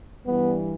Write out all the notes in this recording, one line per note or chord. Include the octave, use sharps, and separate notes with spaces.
G2 E3 G3 B3